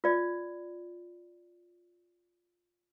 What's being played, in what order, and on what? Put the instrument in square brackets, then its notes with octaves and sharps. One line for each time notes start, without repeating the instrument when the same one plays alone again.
[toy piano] F4 D5